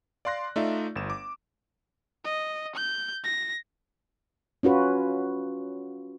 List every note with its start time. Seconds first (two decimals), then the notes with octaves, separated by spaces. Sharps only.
0.25 D5 F5 C6 F#6 A#6
0.56 A3 D#4 F4 D5 E5
0.96 G1 E7
1.10 D6
2.25 D#5
2.76 G6
3.24 A#6
4.63 C#4 F4 F#4 B4